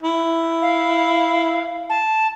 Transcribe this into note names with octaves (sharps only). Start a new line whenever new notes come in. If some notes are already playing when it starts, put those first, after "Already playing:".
E4
F5
A5